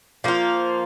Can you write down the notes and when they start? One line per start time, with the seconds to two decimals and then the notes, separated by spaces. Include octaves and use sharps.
0.24 F3 A#3 F4